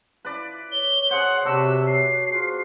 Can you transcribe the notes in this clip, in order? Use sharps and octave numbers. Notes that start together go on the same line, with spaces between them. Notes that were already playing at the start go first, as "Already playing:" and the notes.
E4 F4 B4 D5
C#5 G7
G#4 C5 F#5
C3 D4 F#4 B4 E6
C7
B3 F4 G#4 C5